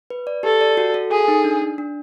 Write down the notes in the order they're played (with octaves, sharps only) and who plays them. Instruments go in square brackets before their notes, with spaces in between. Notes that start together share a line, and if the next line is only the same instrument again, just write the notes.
[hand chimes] B4
D5
[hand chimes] G4 [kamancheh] A4
[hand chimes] D5
F#4
A4
[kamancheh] G#4 [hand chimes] A4
[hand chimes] D#4
D4
D4
D4